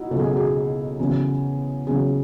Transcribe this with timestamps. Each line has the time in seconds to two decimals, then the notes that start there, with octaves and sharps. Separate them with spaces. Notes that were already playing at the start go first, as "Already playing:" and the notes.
Already playing: D#4 E4 F#4
0.11 C#2 B2 F#3 A4
0.19 G#4
0.28 F#4
0.37 G#4
0.99 E2 C#3 F#3
1.87 E2 C#3 F#3 G#4